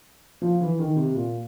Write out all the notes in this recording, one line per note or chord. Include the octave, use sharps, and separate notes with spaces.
F3
E3
D#3
C3
A#2